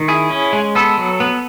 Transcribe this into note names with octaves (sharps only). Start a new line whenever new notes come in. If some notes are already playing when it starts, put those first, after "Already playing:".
Already playing: D#3
E4 G#4
C#4
G#3
B3 A4
F#3
B3